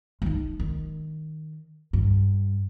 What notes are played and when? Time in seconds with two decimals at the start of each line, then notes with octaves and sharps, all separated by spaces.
0.22 G#3 D#4
0.60 D#3
1.93 G2